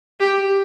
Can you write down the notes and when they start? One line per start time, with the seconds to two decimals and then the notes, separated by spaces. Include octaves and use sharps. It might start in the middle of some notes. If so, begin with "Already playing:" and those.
0.20 G4